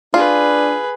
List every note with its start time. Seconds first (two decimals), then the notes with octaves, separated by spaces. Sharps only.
0.14 D4 F4 G#4 B4